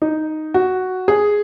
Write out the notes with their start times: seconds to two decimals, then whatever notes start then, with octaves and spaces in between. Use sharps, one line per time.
0.02 D#4
0.54 F#4
1.08 G#4